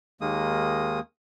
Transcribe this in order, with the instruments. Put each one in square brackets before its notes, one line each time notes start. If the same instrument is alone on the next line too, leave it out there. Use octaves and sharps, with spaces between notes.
[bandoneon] D#2 D#3 G#3 A#3 D#6